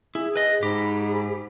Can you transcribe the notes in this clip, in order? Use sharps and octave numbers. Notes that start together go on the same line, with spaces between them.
E4 G#4
B4 D#5
G#2 G4 B5